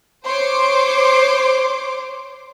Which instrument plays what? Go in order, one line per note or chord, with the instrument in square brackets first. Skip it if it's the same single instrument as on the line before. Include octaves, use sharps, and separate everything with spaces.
[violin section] C5 C#5 C6 D6